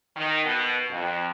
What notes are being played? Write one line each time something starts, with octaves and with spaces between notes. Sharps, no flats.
D#3
B2
F2